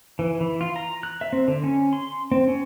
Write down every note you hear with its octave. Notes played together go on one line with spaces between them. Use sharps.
E3
E3
F4
A#5
F#6
E5
C4
D3
C#4
C6
C4
C#4